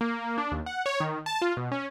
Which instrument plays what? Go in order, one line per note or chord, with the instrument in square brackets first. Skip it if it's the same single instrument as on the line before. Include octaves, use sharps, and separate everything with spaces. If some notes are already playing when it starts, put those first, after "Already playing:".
[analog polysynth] A#3
D4
D#2
F#5
C#5
D#3
A5
F4
B2
C#4